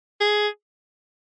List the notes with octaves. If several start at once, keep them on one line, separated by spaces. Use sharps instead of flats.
G#4